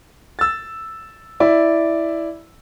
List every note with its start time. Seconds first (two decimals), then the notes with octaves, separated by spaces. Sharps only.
0.39 E6 A6
1.40 E4 D5 E5